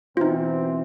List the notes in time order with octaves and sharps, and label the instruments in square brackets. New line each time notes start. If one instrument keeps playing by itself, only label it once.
[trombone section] B2 E3 C4 [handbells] D#4 F4